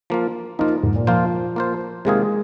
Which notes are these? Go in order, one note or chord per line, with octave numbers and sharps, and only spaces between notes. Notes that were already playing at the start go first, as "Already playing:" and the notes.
F3 A#3 F4
F3 A#3 D#4 F4
G#2
A#2
F3 A#3 F4 C5
A#3 F4 C5
C3 D#3 G#3 A#3 F4 G#4